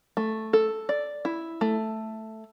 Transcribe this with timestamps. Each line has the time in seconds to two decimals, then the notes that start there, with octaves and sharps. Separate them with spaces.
0.17 A3
0.53 A4
0.89 D5
1.25 E4
1.61 A3